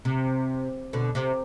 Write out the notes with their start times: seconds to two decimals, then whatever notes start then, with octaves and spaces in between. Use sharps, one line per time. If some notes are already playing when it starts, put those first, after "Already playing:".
0.05 C3
0.93 B2 D3
1.15 C3